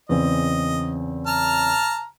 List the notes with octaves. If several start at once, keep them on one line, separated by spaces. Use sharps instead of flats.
E2 C#3 C4 D#5
A5 A#5 F6